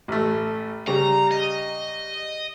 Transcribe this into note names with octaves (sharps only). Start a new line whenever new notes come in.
A1 A3
C#3 G3 A#5
D#5